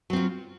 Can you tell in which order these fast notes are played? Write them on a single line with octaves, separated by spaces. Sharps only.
F#3 C4 F4